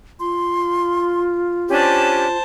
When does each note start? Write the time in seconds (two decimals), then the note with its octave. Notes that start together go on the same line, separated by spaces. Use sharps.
0.20 F4 C6
1.70 C#4 D4 G4 C5 A5